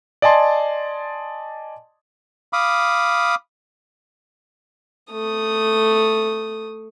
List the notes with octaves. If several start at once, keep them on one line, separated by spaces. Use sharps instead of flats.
D5 D#5 G#5 A5 C6
F5 B5 D6 D#6
A3 D#6